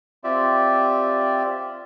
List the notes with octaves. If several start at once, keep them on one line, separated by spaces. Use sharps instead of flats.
C4 F4 G4 D5 E5